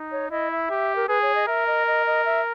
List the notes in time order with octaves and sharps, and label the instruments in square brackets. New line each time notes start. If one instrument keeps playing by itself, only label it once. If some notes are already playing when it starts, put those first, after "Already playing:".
Already playing: [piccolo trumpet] D#4
[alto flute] C#5
[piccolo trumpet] E4 [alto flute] D#5
[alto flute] E5
[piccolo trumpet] G4
[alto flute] A#4
[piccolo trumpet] G#4 [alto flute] B4
[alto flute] C#5
D#5
[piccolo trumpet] A#4 [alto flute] E5
[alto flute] D#5
D#5
D#5
E5